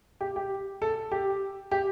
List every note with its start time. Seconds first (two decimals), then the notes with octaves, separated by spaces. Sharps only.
0.21 G4
0.36 G4
0.82 A4
1.12 G4
1.71 G4